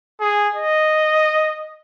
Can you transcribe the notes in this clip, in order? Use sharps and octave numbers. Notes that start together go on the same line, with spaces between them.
G#4
D#5